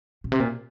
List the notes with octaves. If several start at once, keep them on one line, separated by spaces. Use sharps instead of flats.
A#2
C3
A#2